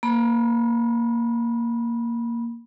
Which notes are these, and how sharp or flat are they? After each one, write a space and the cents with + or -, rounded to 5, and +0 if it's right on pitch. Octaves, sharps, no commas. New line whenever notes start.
A#3 +0 B5 -20